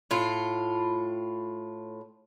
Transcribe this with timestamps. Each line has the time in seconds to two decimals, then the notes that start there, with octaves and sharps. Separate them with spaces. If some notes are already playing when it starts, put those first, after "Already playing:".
0.11 A2 F4